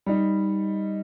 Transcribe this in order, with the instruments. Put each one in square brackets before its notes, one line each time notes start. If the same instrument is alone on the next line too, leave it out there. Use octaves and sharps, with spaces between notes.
[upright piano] G3 D#4